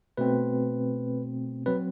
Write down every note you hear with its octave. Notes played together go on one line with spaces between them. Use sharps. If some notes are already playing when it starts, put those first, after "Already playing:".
B2 A3 C4 B4
F#3 C4 B4